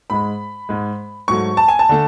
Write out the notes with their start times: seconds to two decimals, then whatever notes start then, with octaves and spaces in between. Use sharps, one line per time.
0.10 G#2 G#3 B5
0.69 G#2 G#3
1.28 G#2 F#3 A3 C#6
1.57 A5
1.68 G#5
1.79 A5
1.89 D3 A3